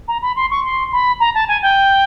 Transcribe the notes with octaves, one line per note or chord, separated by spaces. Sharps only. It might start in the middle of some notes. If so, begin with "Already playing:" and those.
A#5
B5
C6
C#6
C6
B5
A#5
A5
G#5
G5